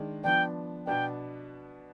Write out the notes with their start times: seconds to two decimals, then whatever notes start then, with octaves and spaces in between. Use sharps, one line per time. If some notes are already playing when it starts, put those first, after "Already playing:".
Already playing: D#3 G#3 D4
0.24 F3 B3 D4 G5
0.87 B2 B3 D4 G5